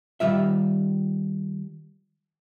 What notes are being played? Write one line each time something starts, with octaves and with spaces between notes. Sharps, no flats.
D#3 G3 F4 E5